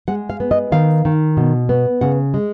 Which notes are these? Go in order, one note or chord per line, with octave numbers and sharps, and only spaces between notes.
G#3 F#5
F5
B3
D#5
D#3 F5
D#3
B2
B3
C#3 F#5
G#3